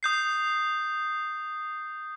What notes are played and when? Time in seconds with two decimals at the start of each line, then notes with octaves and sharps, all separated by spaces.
0.03 D#6 G6 C7